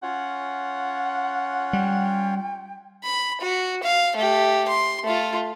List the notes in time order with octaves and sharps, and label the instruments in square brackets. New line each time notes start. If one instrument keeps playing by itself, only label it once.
[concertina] C#4 F4 C#5 [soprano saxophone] F#5
[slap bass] G3 [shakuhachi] G5
[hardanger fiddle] B5
F#4
F5
A3 G4
C6
A3 F4